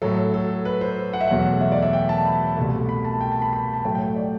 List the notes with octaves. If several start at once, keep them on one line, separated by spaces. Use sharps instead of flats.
A2 F#3 A3 A4
A4
B4
C5
F#5
E5
E2 B2 F#3 A3 F#5
E5
D5
E5
G5
A5
B5
C2 B2 A3
B5
A5
G5
A5
B5
B5
A5
A2 F#3 A3 G5
G5
D5